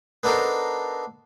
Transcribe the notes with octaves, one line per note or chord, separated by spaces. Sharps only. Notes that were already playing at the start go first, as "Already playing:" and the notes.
B3 D4 D#4 A4 A#4 C5